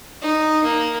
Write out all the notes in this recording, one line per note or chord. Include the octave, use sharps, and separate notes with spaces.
D#4
A#3